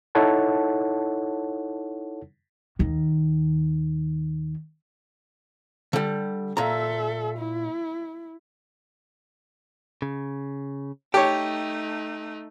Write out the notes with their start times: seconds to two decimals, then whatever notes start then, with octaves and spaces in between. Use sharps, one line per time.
0.15 D#4 E4 A4 C#5 F#5 A5
2.79 D#2 D#3
5.93 D3 G3
6.57 A#2 A4 E5 A#5
7.38 E4
10.02 C#3
11.14 A3 D#4 G4 C#5 G5 A5